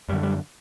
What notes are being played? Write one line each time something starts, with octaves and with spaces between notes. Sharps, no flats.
F#2 D3 G3
G3